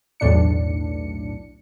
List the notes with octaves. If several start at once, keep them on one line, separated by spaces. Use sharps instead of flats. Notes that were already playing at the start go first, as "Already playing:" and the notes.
B1 E2 A2 D4 C#7